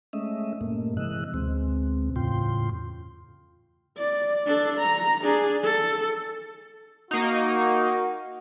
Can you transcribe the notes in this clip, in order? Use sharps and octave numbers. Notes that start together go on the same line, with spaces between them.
G#3 A3 C#4 D#5 E5
G2 A#2 A3 A#3
C3 E3 G#3 D#5 E6 F#6
D2 B2 G#3 C4
E2 A2 C#3 F4 G5 C6
D5
D4 A4
A#5
D4 G#4
A4
A#3 D#4 F#4